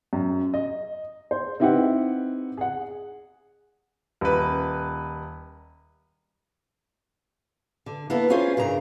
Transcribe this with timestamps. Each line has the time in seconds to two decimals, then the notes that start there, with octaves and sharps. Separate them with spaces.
0.13 F#2
0.54 D#5
1.31 C5
1.60 C4 D#4 E4 G4 B4 F#5
2.57 G#4 F#5
4.21 D#1 B4
7.86 D3
8.10 A#3 B3 E4 A4
8.30 C#4 F4 G#4 C5 C#5
8.57 G2 C#3 A#4 A#5